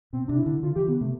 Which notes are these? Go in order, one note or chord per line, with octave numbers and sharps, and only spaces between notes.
B2 C4
C3 D4
E4
D3
D3 F4
E3 G4
D3 B3
C3 A3